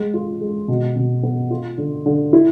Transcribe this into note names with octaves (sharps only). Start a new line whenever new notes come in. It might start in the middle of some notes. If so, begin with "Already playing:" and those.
Already playing: G#3
F4
G#3
B2
B2
B3
F4
D3
D3
E4